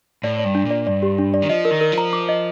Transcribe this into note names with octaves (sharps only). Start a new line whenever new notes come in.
A2 D5
D5
G2
D4
A#2
D5
G2 D5
G4
D4
D5
D#3
F3 D#5
A#4
D#3
A#4
F3
A#5
D6
D#5